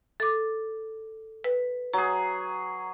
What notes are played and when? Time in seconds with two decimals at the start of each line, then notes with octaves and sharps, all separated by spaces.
0.20 A4 D6
1.44 B4
1.93 F#3 G#4 A#5